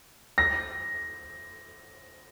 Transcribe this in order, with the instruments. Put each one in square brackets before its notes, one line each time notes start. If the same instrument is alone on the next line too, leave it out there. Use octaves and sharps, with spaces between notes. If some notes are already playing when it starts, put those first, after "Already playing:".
[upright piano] A#6